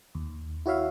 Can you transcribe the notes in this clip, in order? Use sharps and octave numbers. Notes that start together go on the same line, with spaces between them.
D#2
E4 F#4 C#5 E5 F5